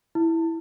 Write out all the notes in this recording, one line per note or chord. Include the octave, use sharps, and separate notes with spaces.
E4